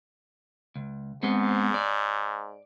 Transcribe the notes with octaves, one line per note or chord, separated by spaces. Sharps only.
C#2
G#2 G#3 B3 C4
D5